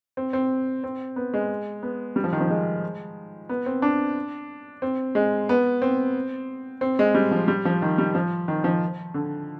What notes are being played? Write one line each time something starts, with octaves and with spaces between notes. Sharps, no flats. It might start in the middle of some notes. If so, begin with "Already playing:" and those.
C4
C4
C4
B3
G#3
B3
G3
F3
D#3
F3
G#3
B3
C4
D4
C4
G#3
B3
C4
C4
G#3
G3
F3
G3
F3
D#3
G3
F3
D#3
F3
D3